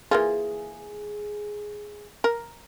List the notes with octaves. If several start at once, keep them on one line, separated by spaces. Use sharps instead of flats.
E3 A#3 F4 G#4
A#4